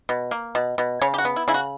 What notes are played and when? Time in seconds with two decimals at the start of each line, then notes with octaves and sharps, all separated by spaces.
0.09 B2
0.31 A#3
0.55 B2
0.78 B2
1.02 C#3 C#5
1.14 G4
1.18 F#4
1.25 B3
1.36 E4
1.48 C#3 E4
1.54 F#4